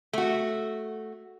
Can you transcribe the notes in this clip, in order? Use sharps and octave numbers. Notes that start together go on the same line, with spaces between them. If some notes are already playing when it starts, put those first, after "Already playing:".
A3 F#4